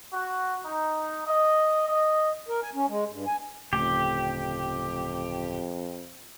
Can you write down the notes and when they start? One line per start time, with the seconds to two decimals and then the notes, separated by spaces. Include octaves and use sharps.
0.13 F#4
0.65 D#4
1.26 D#5
1.89 D#5
2.48 A#4
2.62 G#5
2.75 C#4
2.89 G#3
3.11 G2
3.27 G#5
3.73 D1 F2 C#3 A3 G4